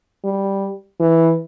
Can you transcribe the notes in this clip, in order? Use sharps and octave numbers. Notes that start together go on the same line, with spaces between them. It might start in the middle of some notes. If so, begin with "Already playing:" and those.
G3
E3